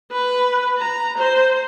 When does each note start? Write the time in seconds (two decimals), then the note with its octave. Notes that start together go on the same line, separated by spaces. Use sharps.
0.12 B4
0.78 A#5
1.18 C5